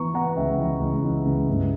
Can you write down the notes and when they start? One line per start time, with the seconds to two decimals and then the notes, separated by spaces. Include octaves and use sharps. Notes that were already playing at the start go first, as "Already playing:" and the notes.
Already playing: E3 B3 A#5 C#6
0.14 B3 F#5 A#5
0.36 C#2 E5 G5
0.58 E3
0.80 C#2
1.04 E3
1.25 C#2
1.48 G2